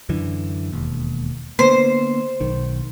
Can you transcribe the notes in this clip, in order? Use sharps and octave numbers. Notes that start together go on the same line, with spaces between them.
F#2 D3 E3
E1 D#2
D3 A#3 B3 C5
B1 D#3